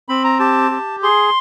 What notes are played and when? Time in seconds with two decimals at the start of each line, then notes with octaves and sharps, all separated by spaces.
0.09 C4 B5
0.24 A#5
0.39 G4 A5
0.71 G4
1.03 G#4 C6